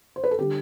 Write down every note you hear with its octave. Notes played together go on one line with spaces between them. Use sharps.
C5
B4
A4
D3 G3 G4